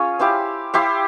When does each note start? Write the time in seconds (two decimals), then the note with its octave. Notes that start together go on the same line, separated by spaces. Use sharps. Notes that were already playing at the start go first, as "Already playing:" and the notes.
Already playing: C#4 F4 G#4 C#5
0.19 E4 G4 C5 F5
0.74 E4 G4 C5 F5